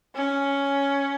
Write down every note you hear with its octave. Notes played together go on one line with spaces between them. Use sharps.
C#4